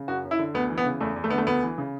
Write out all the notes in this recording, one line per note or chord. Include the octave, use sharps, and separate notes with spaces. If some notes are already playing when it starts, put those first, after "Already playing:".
Already playing: C#3
F#2 F#4
F#2
E4
D3
D2 B3
E3
B3
C#3
E2 A3
E2
A3
D3 B3
A3
D2 B3
E3
C#3